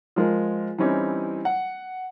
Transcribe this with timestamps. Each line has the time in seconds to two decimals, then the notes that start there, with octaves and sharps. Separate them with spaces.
0.16 F3 G#3 A#4
0.78 E3 G3 C4 C#4 D#4 E4
1.45 F#5